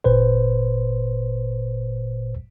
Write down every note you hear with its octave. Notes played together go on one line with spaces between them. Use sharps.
G1 A#2 B4 C5